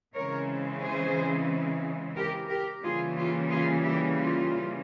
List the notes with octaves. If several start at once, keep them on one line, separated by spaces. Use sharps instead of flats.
C#3 E3 G#3 C4 A#4 C#5
G#4 C5
G4 A#4
G4 A#4
C#3 E3 G3 A#3 F4 G#4
F4
F4 G#4
E4 G4
F4